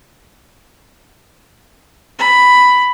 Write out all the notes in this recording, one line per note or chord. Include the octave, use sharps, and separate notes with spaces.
B5